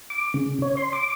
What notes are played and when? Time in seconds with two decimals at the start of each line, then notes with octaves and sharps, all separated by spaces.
0.10 D6
0.34 C#3
0.62 C#5
0.77 C6
0.93 D6